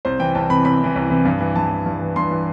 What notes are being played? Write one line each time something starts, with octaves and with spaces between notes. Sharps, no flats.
C2 C5
C3 E3 G5
C2 A5
C3 E3 B5
C2 B5
C3 E3
C2
C3 E3
G2
E3
G2 A5
E3
G2
E3
G2 C6
E3